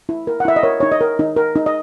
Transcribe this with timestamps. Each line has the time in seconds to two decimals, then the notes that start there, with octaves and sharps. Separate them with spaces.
0.09 E4
0.27 A#4
0.40 F#5
0.45 E4 E5
0.56 D#5
0.63 A#4 C#5
0.80 D#4 C#5
0.91 D#5
1.01 A#4
1.19 D#4
1.36 A#4
1.56 D#4
1.66 D#5